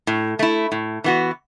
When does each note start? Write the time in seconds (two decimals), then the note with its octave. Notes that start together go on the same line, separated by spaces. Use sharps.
0.07 A2
0.39 A3 E4
0.72 A2
1.04 E3 B3 F#4